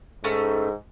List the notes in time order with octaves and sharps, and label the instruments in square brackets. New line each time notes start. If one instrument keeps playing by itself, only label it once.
[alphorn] G#2 [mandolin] A3 C#4 D#4